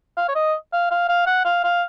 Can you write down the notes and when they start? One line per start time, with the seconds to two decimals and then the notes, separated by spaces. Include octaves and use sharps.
0.17 F5
0.28 C#5
0.35 D#5
0.73 F5
0.91 F5
1.09 F5
1.27 F#5
1.45 F5
1.64 F5